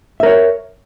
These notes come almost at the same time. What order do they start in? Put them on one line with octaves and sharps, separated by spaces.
E5 A#4 C#5